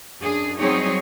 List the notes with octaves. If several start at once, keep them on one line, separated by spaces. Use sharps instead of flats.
F#2 D4 G#4
F#3 G3 C4 D#4 G#4 C#5